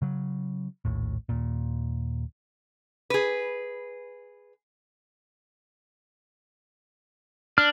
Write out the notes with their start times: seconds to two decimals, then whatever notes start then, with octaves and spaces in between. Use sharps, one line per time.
0.02 C#3 F#3
0.85 A#1 D#2 A2
1.29 D#2 A#2
3.10 G#4 B4
7.58 D4 F6